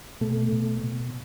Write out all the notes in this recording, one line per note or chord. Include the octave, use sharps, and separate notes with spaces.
B2 A3
B2
B2